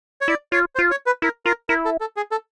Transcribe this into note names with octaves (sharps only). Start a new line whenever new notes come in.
C#5
E4 D5
F4 C#5
C5
F4
C#5
B4
E4 A#4
F4 A#4
E4 A#4
A4
A4
G#4
A4